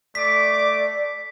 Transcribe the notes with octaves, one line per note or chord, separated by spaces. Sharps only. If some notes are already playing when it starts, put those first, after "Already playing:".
A3 D5 D6 B6